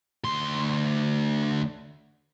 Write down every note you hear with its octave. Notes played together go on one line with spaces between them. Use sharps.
D2 C6